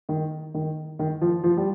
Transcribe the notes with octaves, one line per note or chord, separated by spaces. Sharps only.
D#3
D#3
D#3
F3
F3
G3